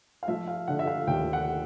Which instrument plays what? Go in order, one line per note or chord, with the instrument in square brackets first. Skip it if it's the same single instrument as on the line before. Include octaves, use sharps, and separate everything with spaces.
[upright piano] F5
F3 E5
F5
D3 F#5
E5
F5
D#2 G5
F#5